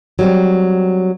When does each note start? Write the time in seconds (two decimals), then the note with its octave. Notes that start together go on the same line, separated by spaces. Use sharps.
0.19 F#3 G3 C4